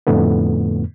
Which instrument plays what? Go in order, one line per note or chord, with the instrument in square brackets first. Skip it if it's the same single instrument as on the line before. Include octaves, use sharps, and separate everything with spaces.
[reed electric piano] F2 A2 D3 A3 B3